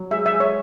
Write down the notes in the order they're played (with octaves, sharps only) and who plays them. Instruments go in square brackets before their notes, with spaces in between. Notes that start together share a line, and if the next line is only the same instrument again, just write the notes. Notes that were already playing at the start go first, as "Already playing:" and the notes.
Already playing: [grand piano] F#3
[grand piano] G#3 [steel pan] E5
[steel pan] E5
[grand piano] G#3
[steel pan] C#5